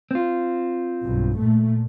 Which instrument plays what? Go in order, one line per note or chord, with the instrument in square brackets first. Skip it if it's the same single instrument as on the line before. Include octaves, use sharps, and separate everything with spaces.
[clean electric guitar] C4 F4
[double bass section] B1 G2
A#2 A3